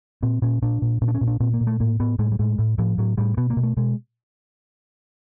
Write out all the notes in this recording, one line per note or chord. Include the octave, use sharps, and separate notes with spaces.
A#2 C4
A#2 C#4
A#2 D4
A#2
A#2 C#4
D4
C#4
A#2
D4
A#2 C4
A#3
A#2
A3
A2 A#3
A2 B3
A2 G#3
G3
A2 G#3
A2
A2 F3
A2 F#3
A2 G3
B2 B3
A#3
B2
A3
B2 G#3